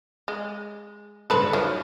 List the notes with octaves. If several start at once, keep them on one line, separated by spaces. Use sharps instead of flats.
G#3
F#1 G2 D3 A4 B4 C5
D#3 F3 F#4 B4 C#5